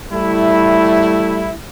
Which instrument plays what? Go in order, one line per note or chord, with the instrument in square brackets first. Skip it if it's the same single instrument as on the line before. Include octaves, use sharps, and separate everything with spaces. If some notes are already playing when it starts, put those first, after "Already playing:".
[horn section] G3 A3 E4